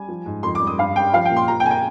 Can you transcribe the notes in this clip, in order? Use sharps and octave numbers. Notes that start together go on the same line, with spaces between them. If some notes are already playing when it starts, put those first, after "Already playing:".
Already playing: G3 G#5
F3
G#2
F2 C6
D6
G3
D#6
G2 F5
G3 G5
F3 F5
G5
A#2
C6
F3 A#5
G5
G#5
G5